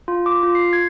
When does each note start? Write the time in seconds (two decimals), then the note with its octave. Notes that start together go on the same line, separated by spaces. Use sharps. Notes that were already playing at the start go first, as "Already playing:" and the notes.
0.08 F4
0.26 D6
0.43 F4
0.55 C7
0.73 G#6